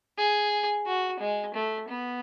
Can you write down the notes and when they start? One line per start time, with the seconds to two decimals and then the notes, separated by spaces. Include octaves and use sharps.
0.18 G#4
0.86 F#4
1.20 G#3
1.54 A3
1.89 B3